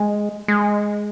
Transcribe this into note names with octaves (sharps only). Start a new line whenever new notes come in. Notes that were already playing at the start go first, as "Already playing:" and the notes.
Already playing: G#3
G#3